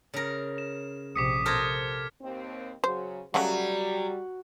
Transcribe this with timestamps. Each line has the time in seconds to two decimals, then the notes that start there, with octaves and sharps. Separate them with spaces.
0.14 C#3 A#4
0.58 E7
1.16 A#1 C3 D6 D#6 B6 C#7
1.46 C3 A4 A#4 C5 F6 G#6
2.22 D#2 C4
2.84 C#3 F#3 C5
3.34 C#3 F#3 G3 A3 F#4